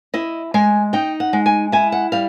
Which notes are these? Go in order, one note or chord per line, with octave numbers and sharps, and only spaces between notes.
E4 D#5
G#3 G#5
D#4 G5
F#5
G#3
G#5
E4 G#5
F#5
G3 F5